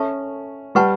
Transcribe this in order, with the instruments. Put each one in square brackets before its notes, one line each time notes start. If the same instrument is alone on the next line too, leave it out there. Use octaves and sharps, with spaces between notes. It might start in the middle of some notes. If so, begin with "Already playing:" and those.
Already playing: [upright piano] C#4 [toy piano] A4 E5 A5 C#6
[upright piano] G3 [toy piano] B4 F#5 A5 C#6